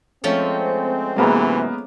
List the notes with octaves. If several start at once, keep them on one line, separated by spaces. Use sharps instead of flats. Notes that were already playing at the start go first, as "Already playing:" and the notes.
F3 G#3 A3 C4 C#4
F#2 C3 E3 G#3 A#3 B3